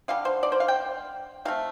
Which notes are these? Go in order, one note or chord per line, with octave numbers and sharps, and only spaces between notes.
D3 G3 F5
C5
D5
C5
F5
G5
C3 A3 F5